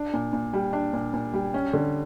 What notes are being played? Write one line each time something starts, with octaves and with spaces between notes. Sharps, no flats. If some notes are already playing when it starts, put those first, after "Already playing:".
Already playing: D4
A#2
A#2
G3
D4
A#2
A#2
G3
C#4
D3